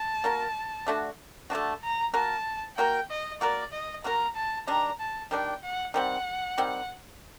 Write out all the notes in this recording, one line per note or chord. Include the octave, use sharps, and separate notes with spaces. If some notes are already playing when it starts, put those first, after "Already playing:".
Already playing: A5
A#3 F#4 A#4
D3 A3 D4 F#4
D3 A3 D4 F#4 A5
A#5
A#3 F#4 A#4 A5
A#3 F#4 A#4 G5
D#5
A#3 F#4 A#4 D5
D#5
A#3 F#4 A#4 A#5
A5
D#3 G3 D4 A#5
A5
D#3 G3 D4 G5
F#5
D#3 G3 C4 F#5
D#3 G3 C4